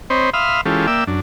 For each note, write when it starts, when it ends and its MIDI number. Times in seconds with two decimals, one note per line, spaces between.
0.10 0.30 60
0.10 0.30 72
0.10 0.30 73
0.10 0.30 75
0.10 0.30 83
0.34 0.61 76
0.34 0.61 77
0.34 0.61 83
0.34 0.61 84
0.34 0.61 87
0.34 0.61 89
0.65 0.87 52
0.65 0.87 56
0.65 0.87 61
0.65 0.87 65
0.65 0.87 67
0.65 0.87 69
0.87 1.04 58
0.87 1.04 74
0.87 1.04 76
0.87 1.04 79
0.87 1.04 88
1.07 1.20 42
1.07 1.20 62